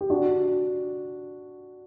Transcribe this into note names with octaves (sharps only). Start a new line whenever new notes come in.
G4
D4 F#4